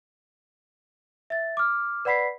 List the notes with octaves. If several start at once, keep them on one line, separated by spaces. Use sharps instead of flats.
E5 A6
D6 F6
B4 D5 F#5 B5 B6 C7